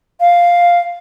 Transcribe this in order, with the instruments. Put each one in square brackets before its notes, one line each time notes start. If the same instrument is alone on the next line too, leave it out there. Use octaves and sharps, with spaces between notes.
[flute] F5